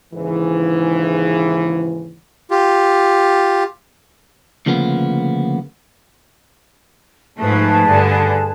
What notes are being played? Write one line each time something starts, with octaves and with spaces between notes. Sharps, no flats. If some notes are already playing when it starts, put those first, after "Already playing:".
D#2 G#2 C#3 E3
F4 G4
D2 C#3 F3 A#3 B3
G#2 F3 A3 G#4 B4 A5
G2 D3